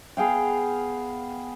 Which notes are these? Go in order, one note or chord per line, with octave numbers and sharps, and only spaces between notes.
B3 G#4 F5 G5